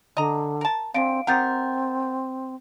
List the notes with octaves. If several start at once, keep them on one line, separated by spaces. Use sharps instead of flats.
D3 D#5 A#5
A#4 A5
D3 G#3 C4 F5 D7
C4 D#4 G4 A#4 F#5 G6 A6